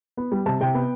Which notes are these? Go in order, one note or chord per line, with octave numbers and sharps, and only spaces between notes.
B3
G3
C3 A5
C3 G5
B3